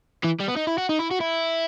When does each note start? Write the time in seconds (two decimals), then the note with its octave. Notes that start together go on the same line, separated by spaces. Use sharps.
0.24 E3
0.40 G3
0.49 B3
0.57 D#4
0.67 E4
0.78 F#4
0.89 D#4
0.99 E4
1.11 F#4
1.21 E4